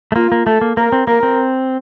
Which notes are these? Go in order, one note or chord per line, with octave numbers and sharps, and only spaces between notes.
A3
A#3 F4
A#3
A3 A4
A#3
A#3 A#4
C4
A#3 A#4
C4